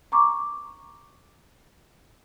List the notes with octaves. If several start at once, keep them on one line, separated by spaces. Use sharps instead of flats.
A#5 C#6 D6